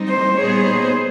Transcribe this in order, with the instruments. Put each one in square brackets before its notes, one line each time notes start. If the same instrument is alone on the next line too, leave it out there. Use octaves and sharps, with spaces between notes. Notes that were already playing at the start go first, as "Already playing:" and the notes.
Already playing: [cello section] G3 C4 D#4
[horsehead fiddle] C5
[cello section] A#2 G3 B3 D#4 G#4 [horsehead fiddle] C#5
[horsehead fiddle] C5